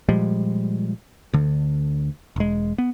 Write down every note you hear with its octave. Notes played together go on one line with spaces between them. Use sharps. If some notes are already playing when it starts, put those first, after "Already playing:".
A#2 F3 G3 G#3
D2 D3
E1 G#3
B3